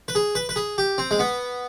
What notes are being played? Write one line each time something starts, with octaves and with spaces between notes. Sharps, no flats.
B4
G#4
B4
B4
G#4
G4
C4
G#3
B3